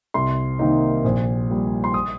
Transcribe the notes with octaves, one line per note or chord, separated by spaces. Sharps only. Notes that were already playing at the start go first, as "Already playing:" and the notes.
C2 C6
C3 D#3 A#3 D#4
A#1
A#2 G3
C6
D#6